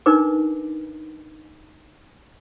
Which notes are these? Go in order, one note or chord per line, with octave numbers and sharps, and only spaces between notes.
D4 D#4 A#4 B4 D6